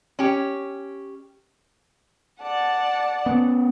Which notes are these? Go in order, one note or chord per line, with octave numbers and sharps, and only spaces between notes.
C#4 G4
D5 F#5 A5
B3 C#4